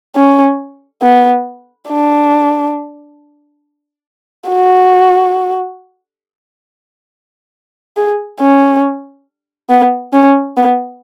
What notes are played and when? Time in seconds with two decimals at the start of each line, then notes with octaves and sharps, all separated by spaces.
0.16 C#4
1.02 B3
1.89 D4
4.49 F#4
7.96 G#4
8.40 C#4
9.70 B3
10.13 C#4
10.57 B3